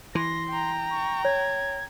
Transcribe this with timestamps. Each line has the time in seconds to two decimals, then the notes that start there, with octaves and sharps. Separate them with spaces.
0.15 E3 C6 A#6
0.50 G5 A#5
0.91 C#6
1.25 C#5 G#6